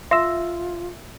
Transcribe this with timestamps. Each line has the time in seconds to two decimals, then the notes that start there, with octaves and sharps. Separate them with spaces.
0.11 F4 E5 C6 E6